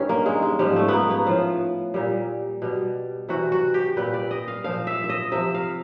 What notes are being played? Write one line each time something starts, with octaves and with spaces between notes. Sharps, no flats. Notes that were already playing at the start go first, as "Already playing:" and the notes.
Already playing: G2 D#3 G3 C#4
A#3
G#3
G#3
G#2 F3 G3
A3
A#3 B3
B3
A2 F3 F4
A#2 G3
B2 G3
C3 E3 G3 F#4
F#4
G4
A#2 G3 B4
D5
D#5
F5
A#2 F3 F5
E5
E5
D#5
C3 F3 E5
F5